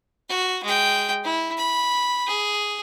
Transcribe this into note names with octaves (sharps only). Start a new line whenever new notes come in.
F#4
G#3 G5
E4
B5
G#4